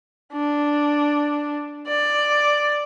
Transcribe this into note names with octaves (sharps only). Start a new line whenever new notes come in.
D4
D5